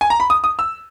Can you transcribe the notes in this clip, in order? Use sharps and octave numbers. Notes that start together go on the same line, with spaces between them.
G#5
A#5
B5
D#6
D#6
E6